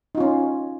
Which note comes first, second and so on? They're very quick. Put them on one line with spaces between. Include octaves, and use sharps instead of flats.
D#4 F4 C#4